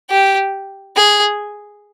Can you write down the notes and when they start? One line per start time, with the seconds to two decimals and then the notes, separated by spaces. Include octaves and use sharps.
0.10 G4
0.96 G#4